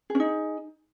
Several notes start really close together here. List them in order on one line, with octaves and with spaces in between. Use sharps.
G#4 C#4 D#4